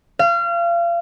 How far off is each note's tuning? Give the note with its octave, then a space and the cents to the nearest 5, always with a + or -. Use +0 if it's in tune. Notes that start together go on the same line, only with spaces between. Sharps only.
F5 -30